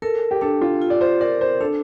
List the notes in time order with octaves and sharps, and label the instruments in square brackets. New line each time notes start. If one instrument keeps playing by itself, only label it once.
[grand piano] A4 [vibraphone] A#4
[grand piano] G4
[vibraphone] D4 [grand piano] A4
[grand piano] F4
[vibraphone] F4
[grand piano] D5
C5
[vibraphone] A#4 [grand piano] D5
[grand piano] C5
[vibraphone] D4 [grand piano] A4